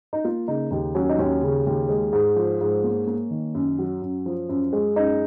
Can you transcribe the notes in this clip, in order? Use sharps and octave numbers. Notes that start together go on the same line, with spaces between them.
D#4
A#3 F4
C#3 D#4
D#2 D#4
F#3 C#4
D#4
D#2 C#4
C#3
D#2
G#3
G#2
F3
G#2
A#3
A#3
D#3
F#2
F#3
F#2
F3
F#2
G#3
F#2 D#4